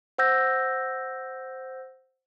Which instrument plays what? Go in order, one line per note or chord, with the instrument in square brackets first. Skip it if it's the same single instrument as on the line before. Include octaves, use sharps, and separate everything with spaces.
[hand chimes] C5 F#5 E6 G6 A#6